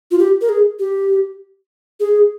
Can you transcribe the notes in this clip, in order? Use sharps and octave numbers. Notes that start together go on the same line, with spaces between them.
F4
G4
A#4
G#4
G4
G#4